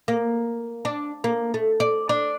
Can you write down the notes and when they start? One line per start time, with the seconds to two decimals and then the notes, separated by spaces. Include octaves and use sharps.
0.08 A#3
0.85 D4
1.24 A#3
1.54 A3
1.80 D5
2.09 D4